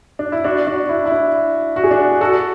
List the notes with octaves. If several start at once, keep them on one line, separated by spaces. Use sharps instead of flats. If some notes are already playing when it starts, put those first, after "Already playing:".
D4
E4
D4 F#4
D4 F#4
E4
E4
D4
F#4
G#4
D4 F#4
F#4 A4